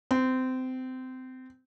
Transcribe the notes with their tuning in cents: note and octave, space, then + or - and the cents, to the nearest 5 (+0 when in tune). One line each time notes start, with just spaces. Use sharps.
C4 -25